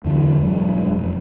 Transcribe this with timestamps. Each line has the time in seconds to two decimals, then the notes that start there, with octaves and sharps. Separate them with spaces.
0.04 E2 D3 E3 F#3
0.41 E1 G2 F#3 G#3
0.97 F1